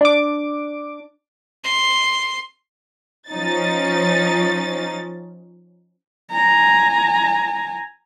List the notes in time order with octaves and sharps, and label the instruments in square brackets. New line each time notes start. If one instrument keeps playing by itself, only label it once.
[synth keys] D4 D6
[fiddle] C6
[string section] F3 C#4 D#4 A6
[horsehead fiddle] G#5 A#5